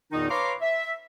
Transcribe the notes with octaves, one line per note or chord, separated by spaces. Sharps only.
E2 A#2 D#3 D#4
B4 C#5 F5 A#5 C6 D6
E5